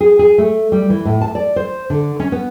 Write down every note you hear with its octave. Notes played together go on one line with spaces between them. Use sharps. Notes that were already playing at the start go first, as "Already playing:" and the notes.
G#4
G#4
A3
G3
E3
A2
A5
D5
C5
D3
C#4
B3